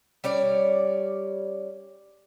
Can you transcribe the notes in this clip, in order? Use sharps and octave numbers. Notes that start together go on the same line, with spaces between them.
G3 C#4 C#5 D5